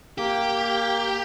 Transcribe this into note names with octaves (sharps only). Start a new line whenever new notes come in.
A#3 G4